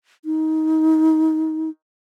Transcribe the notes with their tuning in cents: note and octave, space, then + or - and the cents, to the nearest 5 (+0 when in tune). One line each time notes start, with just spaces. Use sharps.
D#4 +25